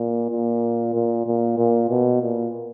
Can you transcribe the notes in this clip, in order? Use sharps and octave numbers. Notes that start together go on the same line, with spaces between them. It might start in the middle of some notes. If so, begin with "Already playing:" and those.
Already playing: A#2
A#2
A#2
A#2
A#2
B2
A#2